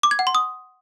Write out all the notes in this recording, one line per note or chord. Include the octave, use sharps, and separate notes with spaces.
D6
G#6
F#5
C6
D#6